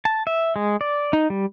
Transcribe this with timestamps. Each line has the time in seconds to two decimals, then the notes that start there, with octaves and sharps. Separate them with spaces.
0.05 A5
0.27 E5
0.56 G#3
0.81 D5
1.13 D#4
1.30 G3